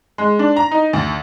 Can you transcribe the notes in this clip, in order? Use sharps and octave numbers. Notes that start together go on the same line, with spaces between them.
G#3
D4
A#5
D#4
D2